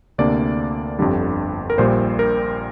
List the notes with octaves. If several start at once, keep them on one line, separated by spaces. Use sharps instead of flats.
D2 C3 A#3 D4 D5
G1 F2 D3 G3
A#4
A#1 A#2 G3 C5
A#4